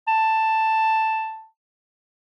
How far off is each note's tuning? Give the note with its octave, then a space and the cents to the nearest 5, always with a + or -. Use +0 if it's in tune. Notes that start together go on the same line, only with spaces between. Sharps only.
A5 +5